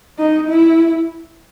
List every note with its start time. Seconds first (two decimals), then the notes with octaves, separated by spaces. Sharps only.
0.19 D#4
0.49 E4